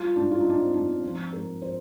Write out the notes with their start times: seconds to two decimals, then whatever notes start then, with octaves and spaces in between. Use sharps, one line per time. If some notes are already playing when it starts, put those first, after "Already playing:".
Already playing: G3 F4
0.16 G#2 D4
0.31 F4
0.41 G3 D#4
0.50 D4
0.59 C4
0.74 G#2 D4
0.89 C4
1.03 F3 C4
1.33 G#2 A#4
1.62 C5